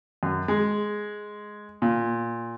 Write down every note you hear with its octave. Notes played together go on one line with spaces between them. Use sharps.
F#2
G#3
A#2